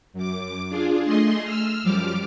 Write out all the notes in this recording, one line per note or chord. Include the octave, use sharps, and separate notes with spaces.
F#2 D6
D4 F4 G#4
A3 G#4 D#5 C6
E6 F6
F#2 F3 G3 D6 F6